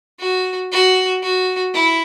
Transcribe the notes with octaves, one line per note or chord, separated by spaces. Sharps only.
F#4
F#4
F#4
E4